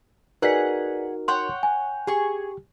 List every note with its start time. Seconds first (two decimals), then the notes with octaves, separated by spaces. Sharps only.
0.42 D#4 F#4 G#4 A#4 B4 D5 F#5 B6
1.28 C#5 F#5 G5 C6
1.63 G#5
2.07 G4 G#4 C#6